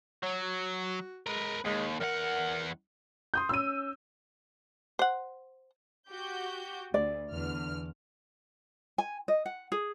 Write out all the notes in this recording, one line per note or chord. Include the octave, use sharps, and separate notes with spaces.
F#3 C#5
F#4
G#3 A#4 B4
D#2 G#3
E2 A#4 F#5
C6 D#6 G6
C#4 E6 D#7
C5 F#5
F#4 G4 G6
D2 D5
E2 D3 F6
G#5
D#5
F#5
G#4